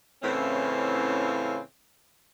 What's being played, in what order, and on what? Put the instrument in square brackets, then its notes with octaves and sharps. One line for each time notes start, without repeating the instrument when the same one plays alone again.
[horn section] A2 C#3 E3 C4 C#4 F4